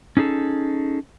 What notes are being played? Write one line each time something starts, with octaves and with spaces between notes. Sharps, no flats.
C#4 D#4 G#4 A4